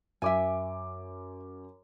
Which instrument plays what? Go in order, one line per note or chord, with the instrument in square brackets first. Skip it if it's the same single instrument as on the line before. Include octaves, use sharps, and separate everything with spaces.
[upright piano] F#2 D6 [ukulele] E5 G#5